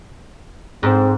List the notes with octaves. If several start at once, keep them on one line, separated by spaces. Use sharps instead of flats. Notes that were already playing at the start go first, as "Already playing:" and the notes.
G#2 C4